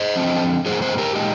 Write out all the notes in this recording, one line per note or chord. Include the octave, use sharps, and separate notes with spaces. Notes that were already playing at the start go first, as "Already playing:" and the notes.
Already playing: C5 D#5
D3 F3 C4
G2 D3 G3 A#3 G#4 C5
G#4 C5
G4 A#4
A#2 G#3 D#4